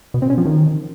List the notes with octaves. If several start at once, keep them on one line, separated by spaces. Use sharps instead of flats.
B2
C4
C#4
F3
D#3